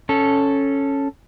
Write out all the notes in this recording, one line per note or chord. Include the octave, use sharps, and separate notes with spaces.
C#4 A4